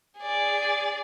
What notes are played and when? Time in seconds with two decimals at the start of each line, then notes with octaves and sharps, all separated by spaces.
0.18 G#4 D5